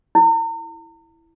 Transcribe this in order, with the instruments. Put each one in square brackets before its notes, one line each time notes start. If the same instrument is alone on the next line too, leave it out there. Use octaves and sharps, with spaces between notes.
[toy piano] E4